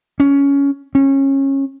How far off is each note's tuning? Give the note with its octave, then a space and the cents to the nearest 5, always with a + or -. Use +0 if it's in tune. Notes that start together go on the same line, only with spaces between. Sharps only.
C#4 +15
C#4 -20